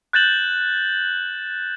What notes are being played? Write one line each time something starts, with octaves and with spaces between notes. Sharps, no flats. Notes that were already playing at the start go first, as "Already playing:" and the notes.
F#6 G6 A6 E7 F#7